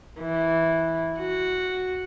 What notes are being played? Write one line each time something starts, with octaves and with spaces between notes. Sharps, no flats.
E3
F#4